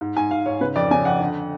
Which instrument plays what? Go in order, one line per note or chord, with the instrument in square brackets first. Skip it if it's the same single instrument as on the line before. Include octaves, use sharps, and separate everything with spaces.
[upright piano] G#2
G#2 G#5
G#2 F5
G#2 C#5
C#3 B4
F2 D5
C#3 G#5
F2 F#5
D3